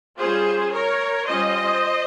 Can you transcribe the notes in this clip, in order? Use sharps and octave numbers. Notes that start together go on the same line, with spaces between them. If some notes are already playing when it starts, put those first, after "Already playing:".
G3 C#4 F4 G#4 C5
A#4 C#5
G3 C#4 F4 C5 D#5